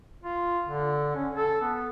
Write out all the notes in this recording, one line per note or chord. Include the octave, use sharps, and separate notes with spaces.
F4
D3
C#4
A4
B3